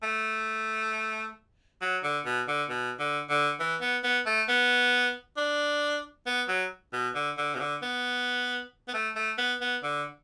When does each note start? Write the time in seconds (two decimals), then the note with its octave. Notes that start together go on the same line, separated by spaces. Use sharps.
0.03 A3
1.81 F#3
2.03 D3
2.26 B2
2.48 D3
2.70 B2
2.99 D3
3.30 D3
3.60 E3
3.81 B3
4.04 B3
4.26 A3
4.48 B3
5.37 D4
6.26 B3
6.48 F#3
6.93 B2
7.15 D3
7.37 D3
7.55 B2
7.60 D3
7.82 B3
8.88 B3
8.94 A3
9.16 A3
9.38 B3
9.61 B3
9.83 D3